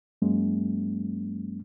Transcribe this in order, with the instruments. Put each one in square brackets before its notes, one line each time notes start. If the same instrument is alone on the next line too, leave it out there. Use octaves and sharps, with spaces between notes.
[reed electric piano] G2 F#3 G#3 A#3 C#4